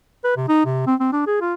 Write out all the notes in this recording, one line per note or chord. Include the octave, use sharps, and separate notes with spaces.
B4
C3
D#4
C3
C4
C4
D4
G#4
F4